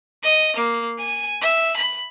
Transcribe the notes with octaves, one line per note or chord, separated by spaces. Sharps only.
D#5
A#3
G#5
E5
B5